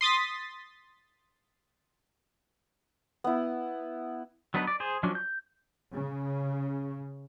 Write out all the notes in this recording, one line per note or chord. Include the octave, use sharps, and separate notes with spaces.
C6 D#6 A6 B6
B3 E4
F#3 B3 D4 D#4 B4
D5
G#4 C5
F3 F#3 C#4 D4
G6
C#3